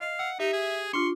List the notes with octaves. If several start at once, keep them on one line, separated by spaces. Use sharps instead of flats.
D#5 F5
F#5 E6
D#4 G4 E5
G#4
D4 F4 C6 C#6